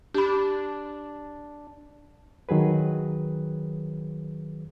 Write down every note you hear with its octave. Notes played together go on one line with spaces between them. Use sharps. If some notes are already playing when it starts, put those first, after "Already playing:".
D4 G4 B5
D#3 F#3 G#4 B4